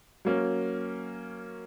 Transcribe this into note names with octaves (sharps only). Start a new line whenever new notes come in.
F#3 A#3 C#4